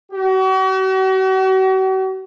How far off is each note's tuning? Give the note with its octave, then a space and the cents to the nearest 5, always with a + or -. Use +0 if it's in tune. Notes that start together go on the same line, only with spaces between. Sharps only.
F#4 +40